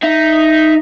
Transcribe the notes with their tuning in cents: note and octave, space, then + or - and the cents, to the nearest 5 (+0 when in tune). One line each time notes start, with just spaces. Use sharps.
D#4 +0 E5 +0